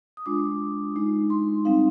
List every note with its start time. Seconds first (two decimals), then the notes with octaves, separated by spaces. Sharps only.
0.17 D#6
0.26 G#3 D4 F4 D6
0.96 G#3 D#4
1.30 C6
1.65 G3 C4 D#4 F5